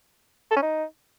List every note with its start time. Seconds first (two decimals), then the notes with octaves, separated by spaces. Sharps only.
0.51 A4
0.56 C#4
0.62 D#4